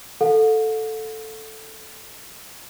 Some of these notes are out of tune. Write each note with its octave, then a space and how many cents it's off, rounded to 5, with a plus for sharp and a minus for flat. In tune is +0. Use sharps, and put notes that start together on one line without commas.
A4 +0 F#5 -45